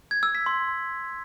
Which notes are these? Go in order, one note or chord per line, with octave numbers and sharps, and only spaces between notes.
G#6
E6
B6
C6